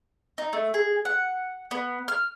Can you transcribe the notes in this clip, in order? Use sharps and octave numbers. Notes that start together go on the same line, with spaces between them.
D#4
A3
G#4
F#5
B3
F6